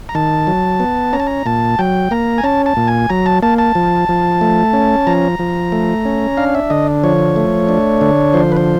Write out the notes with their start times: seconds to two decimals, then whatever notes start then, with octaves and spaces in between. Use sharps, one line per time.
0.09 A#5
0.15 D#3 A5
0.47 F#3
0.80 B3
1.13 C#4 A#5
1.20 A5
1.27 A#5
1.46 A#2 A5
1.79 F#3 G5
2.11 A#3 A#5
2.38 G#5
2.44 C#4 A5
2.66 A5
2.77 A#2
2.88 G#5
3.10 F#3 A#5
3.26 A5
3.42 A#3 A5
3.58 A5
3.75 F3
4.09 F3
4.41 A3
4.73 C#4
5.07 F3 A#5
5.39 F3
5.72 A3
6.05 C#4
6.37 D4 F5
6.55 E5
6.70 D3 D#5
7.04 F3 C#5
7.36 A3
7.69 D4
8.01 D3
8.34 F3 C5
8.52 B4
8.56 C5